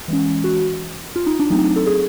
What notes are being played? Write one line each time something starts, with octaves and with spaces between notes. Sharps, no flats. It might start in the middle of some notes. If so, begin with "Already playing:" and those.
E3 G#3 C#4
F#4
F4
D#4
D4
F#3 A3 C4 D#4
A4
G#4